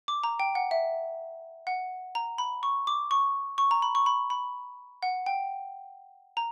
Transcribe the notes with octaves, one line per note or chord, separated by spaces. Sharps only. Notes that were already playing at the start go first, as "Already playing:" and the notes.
D6
A#5
G5
F#5
E5
F#5
A#5
B5
C#6
D6
C#6
C#6
A#5
B5
C#6
B5
B5
F#5
G5
A#5